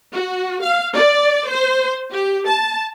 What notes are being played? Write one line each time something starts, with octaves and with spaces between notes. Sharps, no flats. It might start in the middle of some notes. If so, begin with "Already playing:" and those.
F#4
F5
D5
C5
G4
A5